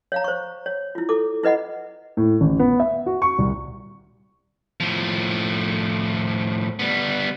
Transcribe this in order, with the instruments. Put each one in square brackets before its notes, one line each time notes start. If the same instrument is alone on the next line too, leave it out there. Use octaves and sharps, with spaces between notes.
[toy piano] C#5 F5 A#5
C5 C#6
C#5
E4 F4
E4 A4 D6
E4 B4 D#5 F#5 B5
[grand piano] A2
A1
B3
E5
F#4
C#6
C2
[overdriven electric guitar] A2 F3
G3 B3